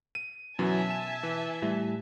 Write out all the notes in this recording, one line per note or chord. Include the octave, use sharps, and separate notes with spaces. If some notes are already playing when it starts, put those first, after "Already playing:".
D#7
F#2 B2 E3 F#3 E5 G#5 A5
E7
E3
A2 G3 E4